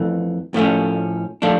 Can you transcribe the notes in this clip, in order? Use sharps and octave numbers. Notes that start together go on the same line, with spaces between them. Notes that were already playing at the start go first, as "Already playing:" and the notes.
Already playing: F2 E3 A3
A2 F3 A3 C#4
F3 A3 D4